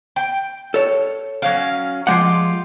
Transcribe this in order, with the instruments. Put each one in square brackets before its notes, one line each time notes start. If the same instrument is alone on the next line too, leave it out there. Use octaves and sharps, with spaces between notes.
[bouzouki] G5
[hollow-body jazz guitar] A4 C#5
[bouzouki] F#3 C#4 F5
[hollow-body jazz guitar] F3 G#3 F#5 [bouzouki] F4 G4